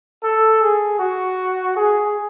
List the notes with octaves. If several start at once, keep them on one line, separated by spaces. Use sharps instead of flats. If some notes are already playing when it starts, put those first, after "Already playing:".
A4
G#4
F#4
G#4